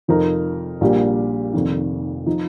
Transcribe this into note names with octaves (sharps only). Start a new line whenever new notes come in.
F1 F2 F3 D#4 A#4
A#1 A#2 G3 A#3 G4
F1 F2 D#3
F3 D#4